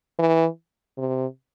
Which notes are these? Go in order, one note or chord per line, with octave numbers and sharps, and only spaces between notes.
E3
C3